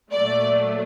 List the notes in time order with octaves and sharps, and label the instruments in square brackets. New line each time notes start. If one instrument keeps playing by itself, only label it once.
[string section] A#2 F#3 A3 D5